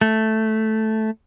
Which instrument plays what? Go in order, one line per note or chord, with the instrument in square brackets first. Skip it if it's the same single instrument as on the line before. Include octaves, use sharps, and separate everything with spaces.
[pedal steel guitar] A3